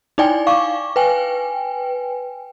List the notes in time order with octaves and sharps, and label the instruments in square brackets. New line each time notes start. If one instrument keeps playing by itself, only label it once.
[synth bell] D#4 E4 D5 G5 G#5
F5 C#6 D6
B4 G5 G#5